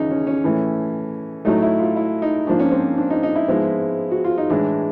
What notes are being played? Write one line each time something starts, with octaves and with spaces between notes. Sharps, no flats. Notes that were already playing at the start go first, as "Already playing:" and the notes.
Already playing: D#2 C#3 E3 G#3 C#4 D#4
C#4
C#4
A2 E3 A3
A2 F#3 A3 D#4
E4
F4
E4
D#4
G#2 F3 A#3 D4
C#4
C4
D4
D#4
D#4
E4
G#2 F3 G#3 B3
F#4
F4
D#4
A2 E3 G#3 D4